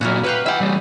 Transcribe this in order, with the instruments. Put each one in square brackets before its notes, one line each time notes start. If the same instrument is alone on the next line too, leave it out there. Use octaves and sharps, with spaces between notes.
[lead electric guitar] A#2 F#3 [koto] A#3 E4 F#4
[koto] F#4 G4 F5 [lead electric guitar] B4
[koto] E4 G4 [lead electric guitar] E5 F#5
[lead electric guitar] E3 G3